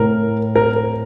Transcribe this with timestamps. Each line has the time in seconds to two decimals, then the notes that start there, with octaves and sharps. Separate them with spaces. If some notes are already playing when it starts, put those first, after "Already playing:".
Already playing: A2 A#4
0.56 A#4
0.76 A#4